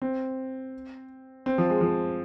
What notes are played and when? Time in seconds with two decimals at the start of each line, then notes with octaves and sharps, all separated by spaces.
0.02 C4
1.46 C4
1.58 F3
1.70 G#3
1.81 F3